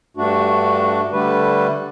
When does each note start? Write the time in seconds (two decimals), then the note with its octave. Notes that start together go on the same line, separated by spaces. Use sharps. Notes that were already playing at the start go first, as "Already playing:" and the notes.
0.17 G2 A3 D4 F#4
1.12 D3 G3 A3 B4